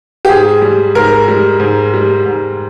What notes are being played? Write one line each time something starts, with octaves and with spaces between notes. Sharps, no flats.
G4
G#2 G#4
G3
G#2 A#4
G3
G#2
G3
G#2